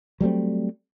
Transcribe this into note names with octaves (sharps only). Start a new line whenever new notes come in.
F#3 G3 A3 C4